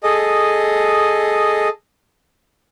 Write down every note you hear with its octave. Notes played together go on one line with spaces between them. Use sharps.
G#4 A4 D#5